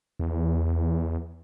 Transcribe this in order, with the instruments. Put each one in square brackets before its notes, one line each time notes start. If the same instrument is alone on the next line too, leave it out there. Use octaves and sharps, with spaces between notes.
[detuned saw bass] E2